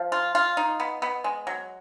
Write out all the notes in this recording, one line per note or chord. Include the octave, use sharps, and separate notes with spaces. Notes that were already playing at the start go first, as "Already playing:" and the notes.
Already playing: F3
F4
F4
D#4
B3
B3
G#3
F#3